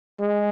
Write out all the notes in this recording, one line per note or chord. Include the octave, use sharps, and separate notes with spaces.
G#3